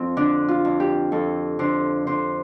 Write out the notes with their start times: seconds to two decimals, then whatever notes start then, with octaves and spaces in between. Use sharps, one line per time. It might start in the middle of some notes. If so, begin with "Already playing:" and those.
Already playing: F2 C4
0.17 D3 D4
0.48 F4
0.65 F2
0.80 G4
1.12 F2 A4
1.59 D3 C5
2.07 D3 C5